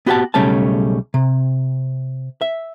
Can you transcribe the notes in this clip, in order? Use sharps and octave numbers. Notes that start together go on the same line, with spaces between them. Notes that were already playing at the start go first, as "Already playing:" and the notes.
B3 F#4 G4 A#4 F#5 A5
B1 C#3 G3 A3 C#4 A5
C3
E5